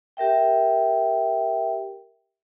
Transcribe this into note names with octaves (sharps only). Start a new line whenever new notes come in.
G4 A#4 E5 G5